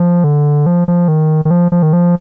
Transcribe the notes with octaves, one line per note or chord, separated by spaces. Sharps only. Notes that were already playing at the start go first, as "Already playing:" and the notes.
Already playing: F3
D3
F3
F3
D#3
D#3
F3
F3
D#3
F3